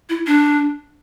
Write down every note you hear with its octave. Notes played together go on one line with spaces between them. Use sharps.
E4
D4